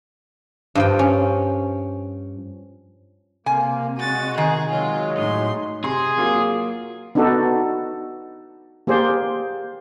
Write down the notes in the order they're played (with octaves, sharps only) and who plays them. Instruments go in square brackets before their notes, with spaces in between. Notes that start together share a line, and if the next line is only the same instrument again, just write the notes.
[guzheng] G2 F3 G5
C#4
[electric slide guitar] C3 [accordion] A#3 [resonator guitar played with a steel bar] G#5
[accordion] G#3 F#4 [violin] A6 D#7
[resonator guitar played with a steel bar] D#3 [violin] G#4
[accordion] F#3 G#3 [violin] F4
[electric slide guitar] A2 D#4 [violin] C6
[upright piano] C3 C6 [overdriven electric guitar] G#4
[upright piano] F#3 A#3 F4
[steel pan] B3 D4 D#4 F#4 A4
A#3 G4 G#4 C5 D5